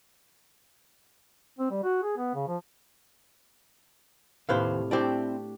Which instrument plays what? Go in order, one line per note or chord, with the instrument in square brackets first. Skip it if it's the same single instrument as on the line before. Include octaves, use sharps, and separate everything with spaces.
[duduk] C4
G3
F#4
G#4
B3
C#3
F3
[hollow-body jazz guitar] D#2 B4 C5 [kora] A2 C3 F5
[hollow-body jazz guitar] C4 E4 D5 [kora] D4 G4